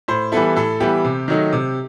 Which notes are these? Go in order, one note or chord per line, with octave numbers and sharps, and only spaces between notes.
A2 C5
E3 G3 B3 E4 A4
A2 A4
E3 G3 B3 E4 G4
C3
D#3 F#3 A3 D#4
C3